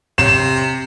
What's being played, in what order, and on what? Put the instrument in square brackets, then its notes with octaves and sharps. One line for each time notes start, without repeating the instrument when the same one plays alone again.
[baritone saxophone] C3 [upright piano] E7